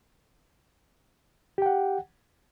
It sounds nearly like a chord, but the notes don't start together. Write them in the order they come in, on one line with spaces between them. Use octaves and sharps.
G4 G5 F#5